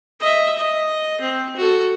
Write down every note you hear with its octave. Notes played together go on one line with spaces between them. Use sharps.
D#5 E5
D#5
C4
F#4 A4